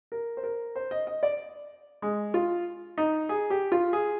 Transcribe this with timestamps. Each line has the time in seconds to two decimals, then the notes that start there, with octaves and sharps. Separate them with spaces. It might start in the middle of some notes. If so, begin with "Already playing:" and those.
0.12 A#4
0.37 C5
0.43 A#4
0.76 C5
0.91 D#5
1.07 D#5
1.23 D5
2.02 G#3
2.34 F4
2.98 D#4
3.29 G#4
3.50 G4
3.72 F4
3.93 G#4